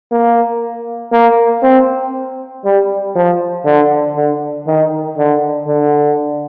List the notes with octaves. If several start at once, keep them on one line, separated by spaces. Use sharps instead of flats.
A#3
A#3
C4
G3
F3
D3
D3
D#3
D3
D3